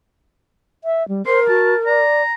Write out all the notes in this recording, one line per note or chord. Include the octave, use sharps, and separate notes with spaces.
E5
G3
A#4 C5 C6
F#4 A5
D5 A#5